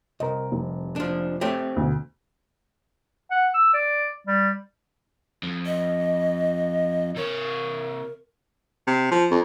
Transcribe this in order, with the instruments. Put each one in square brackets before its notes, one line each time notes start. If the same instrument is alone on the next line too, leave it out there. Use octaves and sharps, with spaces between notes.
[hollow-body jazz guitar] C2 [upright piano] A#4 D#5
[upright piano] F1
[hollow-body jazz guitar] F3 D4
[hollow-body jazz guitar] A3 C4 G4 [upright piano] C#5
[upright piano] D2 B2
[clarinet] F#5
E6
D5
G3
[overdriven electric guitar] F2
[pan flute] D#5
[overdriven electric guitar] C3 C#5 [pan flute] A#4
[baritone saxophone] C3
F3
F2